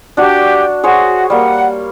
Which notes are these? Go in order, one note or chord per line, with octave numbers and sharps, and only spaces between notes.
D4 F#4 G4
F#4 G#4 C5 C#5
G3 A#3 F#5